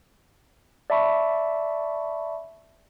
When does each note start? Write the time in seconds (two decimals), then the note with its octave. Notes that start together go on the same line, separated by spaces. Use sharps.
0.90 D5 E5 A5 B5 C#6